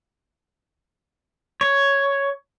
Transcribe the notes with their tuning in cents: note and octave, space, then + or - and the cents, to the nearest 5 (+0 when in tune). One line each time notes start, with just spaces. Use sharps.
C#5 +5